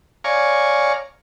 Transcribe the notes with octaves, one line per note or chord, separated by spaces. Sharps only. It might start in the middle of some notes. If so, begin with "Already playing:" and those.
C#5 D5 F5 G#5 A#5 C#6